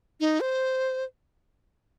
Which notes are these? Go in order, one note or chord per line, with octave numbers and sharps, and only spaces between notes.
D#4
C5